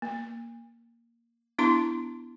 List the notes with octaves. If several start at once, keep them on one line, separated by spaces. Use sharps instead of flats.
A#3
B3 D4 E4 A#5 C6